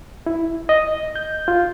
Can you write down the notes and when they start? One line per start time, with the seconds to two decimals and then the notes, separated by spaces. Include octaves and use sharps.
0.26 E4
0.69 D#5
1.16 G6
1.48 F4